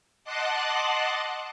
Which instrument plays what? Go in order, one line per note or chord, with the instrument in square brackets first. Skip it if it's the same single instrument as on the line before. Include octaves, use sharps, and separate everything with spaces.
[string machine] D#5 F#5 A5 C6 D6 F#6